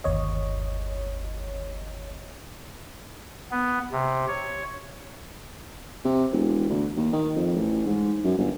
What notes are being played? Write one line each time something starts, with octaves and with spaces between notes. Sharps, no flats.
G1 D#2 C#5 D#5
B3
C3
C#5
C3
E1
D2
D#2
D#3
F2
A1
G#2
F#2
G1